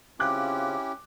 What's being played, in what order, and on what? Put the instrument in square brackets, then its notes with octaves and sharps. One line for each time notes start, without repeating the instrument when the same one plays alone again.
[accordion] C#3 C4 F4 [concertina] C#4 E4 G4 [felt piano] D6 F#6